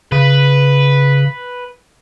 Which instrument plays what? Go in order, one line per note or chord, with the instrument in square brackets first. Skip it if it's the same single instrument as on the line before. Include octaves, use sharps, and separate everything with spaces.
[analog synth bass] C#3 [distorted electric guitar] B4